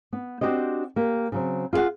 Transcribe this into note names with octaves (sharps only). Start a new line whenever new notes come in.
B3
C4 D4 F#4 G4 C5 D#5
A#3 G4
C#3 F#3 C4
F4 G#4 C5 F5 F#5